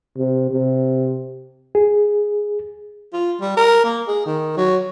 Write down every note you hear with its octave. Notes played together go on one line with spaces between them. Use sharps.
C3
C3
G#4
F4
G3
A#4
A#3
G#4
D#3
F#3